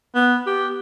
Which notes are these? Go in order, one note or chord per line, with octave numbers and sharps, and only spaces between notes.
B3
G4